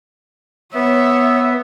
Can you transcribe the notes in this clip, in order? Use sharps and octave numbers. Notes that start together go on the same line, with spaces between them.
B3 C#5 E5